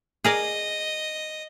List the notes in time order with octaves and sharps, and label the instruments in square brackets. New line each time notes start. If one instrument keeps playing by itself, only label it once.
[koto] G#4 A#4 D5 [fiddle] D#5